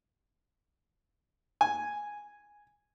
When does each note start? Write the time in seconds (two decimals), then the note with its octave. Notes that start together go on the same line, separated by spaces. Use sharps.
1.61 G#5